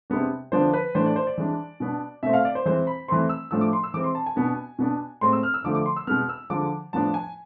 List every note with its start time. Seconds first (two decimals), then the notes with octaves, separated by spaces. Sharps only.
0.10 C3 G#3 B3 D4
0.52 D3 F3 B3 D4 C5
0.74 B4
0.95 A2 E3 A3 D4 C5
1.06 D5
1.16 C5
1.27 D5
1.38 E3 G#3 D4
1.80 B2 B3 D4
2.23 B2 A3 C4 E5
2.33 F5
2.45 D5
2.55 C5
2.66 E3 G#3 C4 C5
2.87 B5
3.08 E3 A3 C4 C6
3.29 E6
3.51 A2 F3 A3 D4 E6
3.61 D6
3.73 C6
3.84 E6
3.94 E3 G#3 C4 D6
4.04 C6
4.15 A5
4.26 G#5
4.36 B2 B3 D4
4.79 B2 B3 D4
5.21 A2 G#3 C4 C6
5.33 E6
5.43 F6
5.54 E6
5.64 D3 F3 A3 D6
5.75 D6
5.86 C6
5.96 E6
6.07 B2 G#3 B3 F6
6.29 E6
6.50 D3 F3 G#3 D4 D6
6.93 A2 F3 B3 D4 A5
7.14 G#5